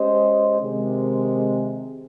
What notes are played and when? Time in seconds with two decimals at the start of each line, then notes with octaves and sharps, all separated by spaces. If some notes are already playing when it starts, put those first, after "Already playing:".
Already playing: G#3 C#4 G4 C5 D#5
0.60 C3 D#3 G#3